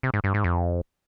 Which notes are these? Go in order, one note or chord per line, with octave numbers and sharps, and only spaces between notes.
C3
G#2
G2
G#2
F2